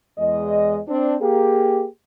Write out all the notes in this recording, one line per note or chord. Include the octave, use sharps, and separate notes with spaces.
E2 G#3 D#5
C4 D4
A#3 G4 G#4